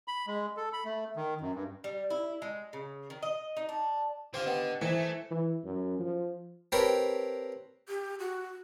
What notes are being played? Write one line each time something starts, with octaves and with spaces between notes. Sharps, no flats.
B5
G#3
A4
B5
A3
D#3
F#2
G2
G3
E4
G#3
C#3
D#3
D#5
D#4
D4
D3 F4 G4 C5
B3 G4 D#5 G5
E3 A3 D#4 C5 E7
E3
F#2
F3
C4 G4 A#4 B4 C#5 A5
G4
F#4